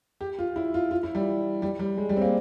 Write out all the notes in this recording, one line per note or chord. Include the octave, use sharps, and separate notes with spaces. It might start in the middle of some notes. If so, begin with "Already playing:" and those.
G4
F4
E4
F4
F4
E4
G3
G3
G3
G#3
G3
C4
A#3